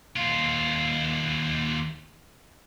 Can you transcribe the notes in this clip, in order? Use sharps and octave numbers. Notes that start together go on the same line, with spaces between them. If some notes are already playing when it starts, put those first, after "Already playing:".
D#2 F4